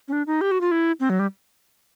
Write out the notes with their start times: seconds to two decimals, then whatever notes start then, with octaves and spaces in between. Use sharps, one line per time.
0.08 C#4
0.12 D4
0.27 D#4
0.41 G4
0.51 F#4
0.61 F4
0.71 E4
1.00 C4
1.10 F#3
1.19 G3